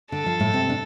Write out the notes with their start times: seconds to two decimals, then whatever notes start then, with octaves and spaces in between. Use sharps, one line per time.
0.11 D3 A4
0.26 F3
0.40 A2 A3
0.54 C3 C4
0.69 D4